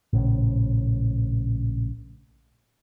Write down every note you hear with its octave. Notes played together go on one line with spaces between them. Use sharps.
A#1 A2 C#3